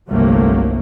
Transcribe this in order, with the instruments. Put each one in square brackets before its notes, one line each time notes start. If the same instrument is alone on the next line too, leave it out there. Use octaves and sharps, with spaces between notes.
[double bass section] G1 C2 C3 F#3 A3 A#3